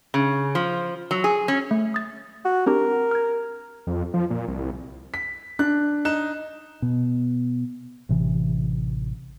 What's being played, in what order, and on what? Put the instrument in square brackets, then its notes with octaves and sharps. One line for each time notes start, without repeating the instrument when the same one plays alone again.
[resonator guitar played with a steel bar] C#3
F3
F#3
G#4
C#4
[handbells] A3
D#6 A6
[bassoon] F#4
[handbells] C4 D4 G4 [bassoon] A#4
[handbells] F6 G#6
[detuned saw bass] F2
F3
A#2
C2
[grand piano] B6
[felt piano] D4 [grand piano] F#6
[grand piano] D#4 F#6 E7
[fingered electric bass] B2
A1 C3 E3